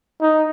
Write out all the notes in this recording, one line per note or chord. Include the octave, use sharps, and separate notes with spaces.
D#4